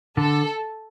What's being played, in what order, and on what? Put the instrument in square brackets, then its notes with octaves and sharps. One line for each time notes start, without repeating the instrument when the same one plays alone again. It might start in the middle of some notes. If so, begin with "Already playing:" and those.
[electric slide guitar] D3 [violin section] A4